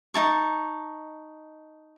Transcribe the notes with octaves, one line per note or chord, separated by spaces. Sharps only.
D#4 E4 A5 C#6